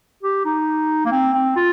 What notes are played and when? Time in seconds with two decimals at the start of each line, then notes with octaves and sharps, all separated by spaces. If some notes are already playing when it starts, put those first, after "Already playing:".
0.23 G4
0.45 D#4
1.05 A#3
1.12 C4
1.34 C4
1.56 F4